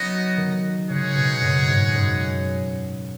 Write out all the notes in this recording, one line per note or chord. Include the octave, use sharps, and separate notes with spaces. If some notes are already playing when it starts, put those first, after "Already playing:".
Already playing: F#3 B3 C#4 D#4 F#4 D#5
D#3
C#3 G#3 D#4 G#4 C#5 F#5
B2
F#2
G#2
F#2